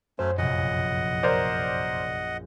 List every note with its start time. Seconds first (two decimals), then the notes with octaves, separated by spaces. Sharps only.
0.19 F#2 F#3 A3 C#4 C5
0.38 A#1 F2 C3 D#5 F#5
1.23 A#4 C5 D5